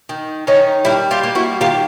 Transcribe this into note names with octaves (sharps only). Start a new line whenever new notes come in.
D#3
D#3 C#4 D#4
G3 D4 E4
F4 G4
A#3
E4 F#4
D#3 F4 G4